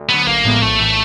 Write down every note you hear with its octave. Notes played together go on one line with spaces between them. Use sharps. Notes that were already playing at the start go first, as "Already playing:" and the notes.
Already playing: D2
D3 F#3 B3
A1 A#3
A2 F3 G#3 B3
A#1 A3
A2 E3